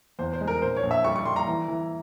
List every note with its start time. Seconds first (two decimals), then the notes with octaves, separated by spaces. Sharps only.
0.19 E2 C5
0.33 C5
0.41 G#3
0.48 A#4
0.62 A#1 C5
0.77 C#5
0.83 A#1
0.91 E5
1.04 G3 C#6
1.16 C#6
1.25 G3 C6
1.36 A#5
1.47 E3
1.68 E3